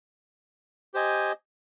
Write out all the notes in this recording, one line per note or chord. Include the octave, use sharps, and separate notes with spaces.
G4 C5 D#5 G#5